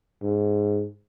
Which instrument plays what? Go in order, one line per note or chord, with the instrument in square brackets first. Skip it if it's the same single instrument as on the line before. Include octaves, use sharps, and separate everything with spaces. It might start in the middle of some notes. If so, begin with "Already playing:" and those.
[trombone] G#2